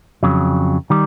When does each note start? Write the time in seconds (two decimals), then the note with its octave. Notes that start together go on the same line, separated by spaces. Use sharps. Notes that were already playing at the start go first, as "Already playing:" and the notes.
0.23 F2 C#3 F#3
0.90 D#3 G3